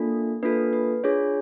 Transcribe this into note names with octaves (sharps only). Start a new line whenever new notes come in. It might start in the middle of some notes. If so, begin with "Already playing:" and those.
Already playing: A#3 D4 F4 A4
A#3 D4 F4 A4 B4
B4
D4 F4 G#4 C#5